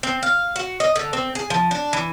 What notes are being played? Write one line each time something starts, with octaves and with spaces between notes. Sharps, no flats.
C4
F5
F#4
D#5
D3
C4
G#4
F3
D4
E3